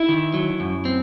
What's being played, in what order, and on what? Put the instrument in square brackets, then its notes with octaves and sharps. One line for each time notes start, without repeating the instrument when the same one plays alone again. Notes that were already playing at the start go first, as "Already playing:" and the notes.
Already playing: [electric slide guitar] E4
D#3
F#3
F#2
C4